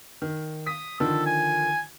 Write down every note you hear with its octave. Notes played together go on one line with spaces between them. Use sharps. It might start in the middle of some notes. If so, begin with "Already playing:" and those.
D#3
D#6 B6
D3 D#3 F3 A4
G#5